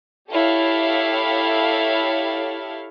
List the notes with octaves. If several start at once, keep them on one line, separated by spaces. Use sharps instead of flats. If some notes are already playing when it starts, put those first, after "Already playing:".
E4 G4 A4 C#5 F5